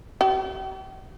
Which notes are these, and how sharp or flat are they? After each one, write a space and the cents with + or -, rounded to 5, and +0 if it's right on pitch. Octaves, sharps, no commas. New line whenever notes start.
G4 -45